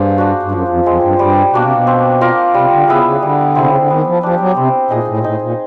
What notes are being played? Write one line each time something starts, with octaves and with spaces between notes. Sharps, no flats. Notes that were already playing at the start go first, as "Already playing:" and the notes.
Already playing: G2 A#3 G#4 C5
D4 F#4
G2
F#2 F3
F2
F2 G#3 C4
G2
G2 G3
B2 A#3 D4 F#4
C3
B2
C4
F4 A#4 D5
C3 G3
D3
C#3 B3 E4 G#4
C#3
D3 G3
C3 C4 E4 G#4
C#3
D3
D#3 B3
F3
F3 D4 G4
F#3
C3 C4
A#2 D#4 G#4
A#2
A2
A#2
A2 D#4
A#2